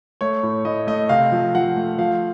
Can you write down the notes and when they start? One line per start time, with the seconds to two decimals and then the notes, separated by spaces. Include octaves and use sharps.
0.21 A3 C#5
0.43 A2
0.65 A2 D#5
0.87 A3 D#5
1.09 C3 F5
1.32 F3
1.55 F3 F#5
1.76 A3
1.98 F3 F5